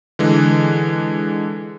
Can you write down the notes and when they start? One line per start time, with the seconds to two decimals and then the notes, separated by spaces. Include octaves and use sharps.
0.19 D3 E3 G#3